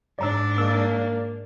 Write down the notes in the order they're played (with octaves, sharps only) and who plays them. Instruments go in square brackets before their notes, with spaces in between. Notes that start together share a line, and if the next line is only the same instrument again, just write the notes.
[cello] G#2 D4 [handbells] D5 A#5 E6
[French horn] A#3 [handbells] E6